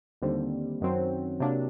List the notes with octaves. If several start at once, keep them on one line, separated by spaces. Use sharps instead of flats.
D#2 D3 G3 C4
F#2 D#3 F#3 C4
C3 F#3 A#3 D4